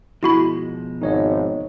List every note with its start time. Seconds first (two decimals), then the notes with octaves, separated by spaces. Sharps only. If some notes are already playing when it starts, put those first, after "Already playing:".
0.23 B2 F3 G#3 E4 F#4 B5
1.02 G#1 D#4 C#5 D#5